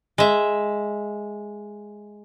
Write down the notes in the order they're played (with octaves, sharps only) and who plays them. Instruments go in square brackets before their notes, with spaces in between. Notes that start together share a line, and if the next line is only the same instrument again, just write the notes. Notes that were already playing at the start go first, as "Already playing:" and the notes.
[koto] G#3 E5